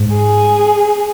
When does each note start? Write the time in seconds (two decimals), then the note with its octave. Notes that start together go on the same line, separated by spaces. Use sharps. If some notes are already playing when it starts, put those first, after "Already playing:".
Already playing: G#2
0.15 G#4